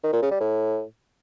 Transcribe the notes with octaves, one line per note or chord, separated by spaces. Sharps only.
D#3
A#2
C#3
G3
A2